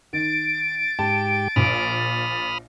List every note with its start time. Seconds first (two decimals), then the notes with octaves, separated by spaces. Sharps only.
0.13 D#3 A6 D7
0.99 G#2 G4 G5 A5
1.56 A#1 A#2 B5 D#6 F6